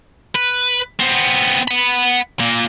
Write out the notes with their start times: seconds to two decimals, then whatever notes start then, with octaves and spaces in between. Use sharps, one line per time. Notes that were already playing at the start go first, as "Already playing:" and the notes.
0.35 B4
1.00 B3 C4
1.68 F#5 B5
2.40 A#2 A#3